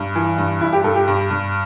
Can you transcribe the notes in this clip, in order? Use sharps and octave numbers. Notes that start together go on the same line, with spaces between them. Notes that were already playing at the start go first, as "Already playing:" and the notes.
Already playing: G2
E3
G2
G2 E4
G4
G2 A4
G4
G2
G2